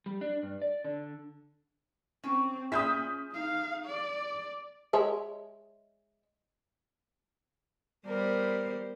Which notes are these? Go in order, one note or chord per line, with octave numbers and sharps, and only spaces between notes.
G3
D4
G2
D5
D3
C4 C#4
C#4 F4 G#4 E5 D#6 G6 B6
D#4 F5
D5
G#3 C#5 E5
G3 B3 A#4 C5